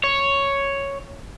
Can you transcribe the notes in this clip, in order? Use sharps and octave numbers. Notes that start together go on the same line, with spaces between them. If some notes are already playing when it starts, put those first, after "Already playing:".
C#5